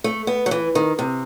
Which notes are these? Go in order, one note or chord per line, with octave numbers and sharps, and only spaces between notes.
A3
B3
F#3
E3
D#3
C3